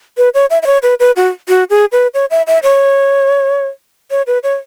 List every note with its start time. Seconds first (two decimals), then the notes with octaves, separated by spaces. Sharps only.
0.18 B4
0.34 C#5
0.50 E5
0.62 E5
0.66 C#5
0.83 B4
1.00 B4
1.16 F#4
1.49 F#4
1.70 G#4
1.92 B4
2.14 C#5
2.31 E5
2.47 E5
2.63 C#5
4.11 C#5
4.27 B4
4.43 C#5